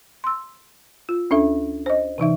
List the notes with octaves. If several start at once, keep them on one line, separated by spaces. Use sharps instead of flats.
C6 E6
F4
D2 C#4 D4 A4 E5
C5 D#5
C3 E3 D#4 E5